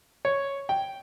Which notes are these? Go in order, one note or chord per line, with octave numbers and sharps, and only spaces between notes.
C#5
G5